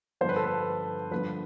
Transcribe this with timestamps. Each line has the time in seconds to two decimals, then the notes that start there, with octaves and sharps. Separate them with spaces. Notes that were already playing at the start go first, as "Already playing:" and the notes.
0.21 G2 D3 F3 C5
0.29 B4
0.36 A4
0.44 B4
1.11 G2 D3 F3 B4